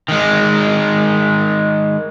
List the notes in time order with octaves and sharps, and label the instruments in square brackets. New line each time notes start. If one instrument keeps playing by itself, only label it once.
[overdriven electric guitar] D#3 G#3